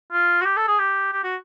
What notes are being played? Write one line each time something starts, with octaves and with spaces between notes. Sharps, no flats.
F4
F#4
G4
A4
G#4
G4
G4
F#4